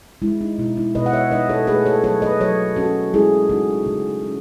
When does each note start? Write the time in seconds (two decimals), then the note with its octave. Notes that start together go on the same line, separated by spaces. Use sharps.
0.22 G#3 E4
0.41 D#4
0.58 B2 E4
0.77 E4
0.95 B2 B4 D#5
1.06 F#5
1.13 C#5 E5
1.31 D#4 B4 D#5
1.49 A4 C#5
1.67 A3 G#4 B4
1.86 A4 C#5
2.04 F#3 A4 C#5
2.22 B4 D#5
2.40 F#3 A4 C#5
2.76 C#4 F#4 A4
3.13 G#3 E4 G#4
3.49 C#3 D#4 F#4
3.86 C#3
4.22 C#4